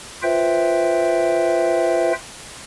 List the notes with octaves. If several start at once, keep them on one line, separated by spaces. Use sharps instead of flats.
F4 B4 C5 E5 G5